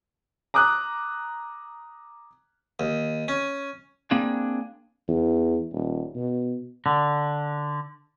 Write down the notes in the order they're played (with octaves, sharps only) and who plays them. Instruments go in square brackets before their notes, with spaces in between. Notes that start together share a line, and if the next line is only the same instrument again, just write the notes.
[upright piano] A#5 D6 D#6 F#6
[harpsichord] D#2
C#4
[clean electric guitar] A#3 C4 D4 G#4
[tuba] E2
D#1
B2
[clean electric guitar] D3